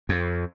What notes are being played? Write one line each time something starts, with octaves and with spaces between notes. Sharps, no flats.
F2